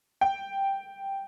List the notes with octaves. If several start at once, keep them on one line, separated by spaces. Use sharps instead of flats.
G5